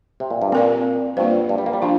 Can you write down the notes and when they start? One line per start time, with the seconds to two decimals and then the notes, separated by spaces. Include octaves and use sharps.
0.20 C3
0.30 A#2
0.42 G2
0.52 A#2 C4 A#4 D5
1.17 G2 A#3 F4 C5
1.49 G2
1.58 G3
1.66 A#3
1.73 G3
1.82 F3 D4 F4